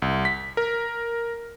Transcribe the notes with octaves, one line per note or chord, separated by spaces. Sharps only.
C2
B6
A#4